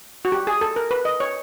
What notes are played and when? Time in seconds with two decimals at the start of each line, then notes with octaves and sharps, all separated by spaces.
0.25 F#4
0.32 G4
0.47 G#4
0.61 A4
0.76 A#4
0.91 B4
1.05 D#5
1.20 C#5